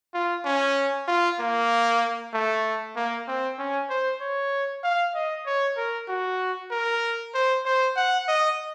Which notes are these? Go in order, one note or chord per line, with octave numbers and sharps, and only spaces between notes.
F4
C#4
F4
A#3
A3
A#3
C4
C#4
C5
C#5
F5
D#5
C#5
A#4
F#4
A#4
C5
C5
F#5
D#5